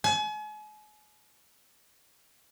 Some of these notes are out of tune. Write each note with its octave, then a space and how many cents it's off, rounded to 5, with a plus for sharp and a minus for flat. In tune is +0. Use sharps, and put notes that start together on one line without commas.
G#5 +40